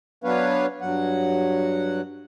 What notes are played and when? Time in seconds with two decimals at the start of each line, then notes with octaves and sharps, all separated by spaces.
0.24 F#3 B3 D4 B4 C#5 F5
0.81 G2 F#3 F#5